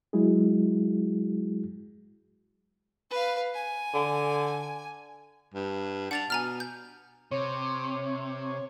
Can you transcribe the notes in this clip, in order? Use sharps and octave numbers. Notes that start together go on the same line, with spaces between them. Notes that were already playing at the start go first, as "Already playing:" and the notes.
F#3 G#3 E4 F#4 G#4
B4 F5
G#5
D3
G2
D4 F#5 A6 F7
B2 G#5 A#5 F6
G6
C3 C#5